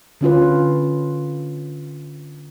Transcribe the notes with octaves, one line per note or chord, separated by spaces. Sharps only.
D3 C#4 F4 B4